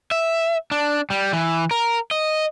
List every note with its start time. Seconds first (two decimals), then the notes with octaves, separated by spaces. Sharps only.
0.11 E5
0.71 D4
1.10 G3
1.33 E3
1.71 A#4
2.11 D#5